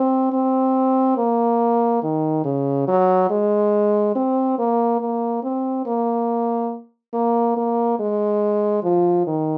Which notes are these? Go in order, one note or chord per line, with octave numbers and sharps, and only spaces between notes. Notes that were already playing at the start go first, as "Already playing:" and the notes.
Already playing: C4
C4
A#3
D#3
C#3
F#3
G#3
C4
A#3
A#3
C4
A#3
A#3
A#3
G#3
F3
D#3